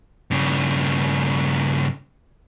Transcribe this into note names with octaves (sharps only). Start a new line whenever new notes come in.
G2 C#3